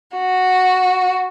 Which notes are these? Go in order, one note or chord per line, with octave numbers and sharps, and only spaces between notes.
F#4